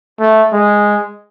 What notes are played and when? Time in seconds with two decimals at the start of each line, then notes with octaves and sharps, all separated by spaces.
0.20 A3
0.52 G#3